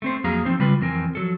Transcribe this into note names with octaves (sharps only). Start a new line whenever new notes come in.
A3 C4 C5
F2 F#3 A#3 G#4 F5 A#5
F3 C4 D#4 C5
C#3 G3 F4 B4
F2 E3 C4 A#4 G5 G#5
F3 F#3 A4